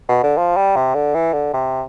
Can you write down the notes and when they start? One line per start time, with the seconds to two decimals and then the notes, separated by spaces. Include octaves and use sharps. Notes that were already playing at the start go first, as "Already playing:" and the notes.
0.09 B2
0.23 D3
0.38 F3
0.57 G3
0.76 C3
0.95 D3
1.14 E3
1.33 D3
1.53 C3